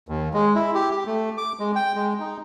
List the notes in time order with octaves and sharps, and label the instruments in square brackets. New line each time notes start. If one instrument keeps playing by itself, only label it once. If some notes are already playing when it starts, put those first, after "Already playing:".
[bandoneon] D#2
G#3
E4
G4
G4
A3
D6
G#3
G5
G#3
D#4